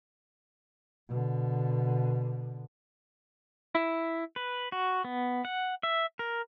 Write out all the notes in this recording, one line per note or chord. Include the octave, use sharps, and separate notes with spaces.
B2 D3
E4
B4
F#4
B3
F#5
E5
A#4